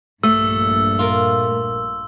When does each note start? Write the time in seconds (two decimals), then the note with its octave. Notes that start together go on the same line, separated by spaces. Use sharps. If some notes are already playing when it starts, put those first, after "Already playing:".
0.23 A#1 G2 A#2 A3 E6
0.99 F4 A#4